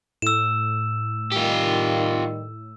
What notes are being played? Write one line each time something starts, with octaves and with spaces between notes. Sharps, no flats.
A2 E6 E7
D#3 G3 F4 G4